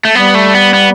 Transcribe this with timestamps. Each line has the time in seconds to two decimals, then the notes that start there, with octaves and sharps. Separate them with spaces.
0.05 A3
0.15 G3 B3
0.35 A3
0.55 B3
0.74 B3